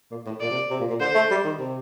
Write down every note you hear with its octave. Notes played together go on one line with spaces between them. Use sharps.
A#2
A2
A#2 D5
C3
C3
A#2
A#2
D3 C5
A3
G3
D#3
C3